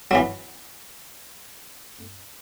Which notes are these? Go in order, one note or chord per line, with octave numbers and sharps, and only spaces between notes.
E3 F#3